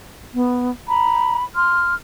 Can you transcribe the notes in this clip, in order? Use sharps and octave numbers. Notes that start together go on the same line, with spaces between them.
B3
A#5 B5
C6 F6